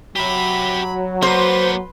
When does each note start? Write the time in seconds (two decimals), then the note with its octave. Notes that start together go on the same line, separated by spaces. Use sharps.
0.16 F#3 G4 E5 B5
1.22 A#3 B3 B4 C5 C6